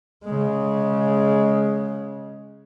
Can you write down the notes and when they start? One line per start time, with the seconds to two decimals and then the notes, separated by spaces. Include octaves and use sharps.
0.25 C#3 G#3